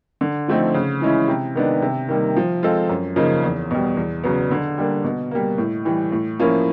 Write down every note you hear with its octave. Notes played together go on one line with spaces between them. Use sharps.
D3
F3 A3 C4 D#4
C#3
E3 G#3 C#4 E4
C3
D#3 G#3 B3 D4
C3
D#3 G3 A#3
F3
G#3 C4 F4 A4
F#2
C#3 F3 A#3 D#4
E2
B2 G3
E2
C#3 F#3 B3
D3
G3 A#3 D4
B2
G3 A#3
A2
E3 G3
A2
F3 A#3 C#4 E4